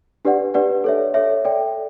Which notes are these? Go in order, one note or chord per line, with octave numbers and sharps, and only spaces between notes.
D4 G4 B4 D5 F#5
D4 G4 B4 D5 F#5
A4 C#5 E5
A4 C#5 E5
A4 D5 G5